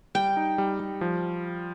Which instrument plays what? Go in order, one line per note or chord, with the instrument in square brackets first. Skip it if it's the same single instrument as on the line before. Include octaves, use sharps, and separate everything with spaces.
[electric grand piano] G3 [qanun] G5
[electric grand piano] D#4
G3
G3
F3